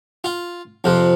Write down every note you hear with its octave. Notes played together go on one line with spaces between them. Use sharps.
F4
F2 C3 F3